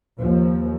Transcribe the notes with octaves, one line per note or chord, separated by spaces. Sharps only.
D#2 F3